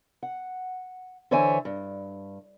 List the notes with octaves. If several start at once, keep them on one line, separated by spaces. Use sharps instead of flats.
F#5
D3 E3 C5 C#5 E5 G#5
G2